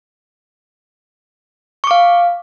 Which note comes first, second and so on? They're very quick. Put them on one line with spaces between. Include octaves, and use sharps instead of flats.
C#6 D6 F5